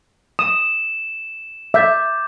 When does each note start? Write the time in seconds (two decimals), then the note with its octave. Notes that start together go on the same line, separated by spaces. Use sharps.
0.39 D#6 E7
1.74 E5 D6 G6 A6